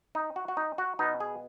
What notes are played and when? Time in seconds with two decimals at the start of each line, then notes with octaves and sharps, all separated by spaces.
0.15 D#4
0.36 F#4
0.48 F#4
0.57 D#4
0.78 F#4
0.99 B2 B3 D#4
1.20 G#4